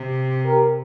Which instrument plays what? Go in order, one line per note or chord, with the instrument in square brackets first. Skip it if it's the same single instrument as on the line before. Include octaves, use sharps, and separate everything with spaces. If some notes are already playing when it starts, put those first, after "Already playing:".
Already playing: [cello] C3
[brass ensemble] G4 A#4